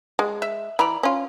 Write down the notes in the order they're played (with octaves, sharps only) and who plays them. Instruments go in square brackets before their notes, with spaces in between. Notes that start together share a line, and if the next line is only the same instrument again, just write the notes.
[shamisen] G#3
[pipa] E5
[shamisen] E3 [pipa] D5 A#5 B5
[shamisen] C#4 F4